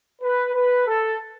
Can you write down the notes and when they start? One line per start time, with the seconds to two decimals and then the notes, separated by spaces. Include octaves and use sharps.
0.22 B4
0.54 B4
0.87 A4